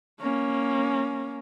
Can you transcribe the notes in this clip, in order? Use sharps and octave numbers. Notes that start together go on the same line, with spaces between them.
A#3 C#4